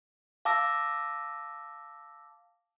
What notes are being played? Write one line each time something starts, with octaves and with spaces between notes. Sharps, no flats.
F5 A5 D6 E6 A#6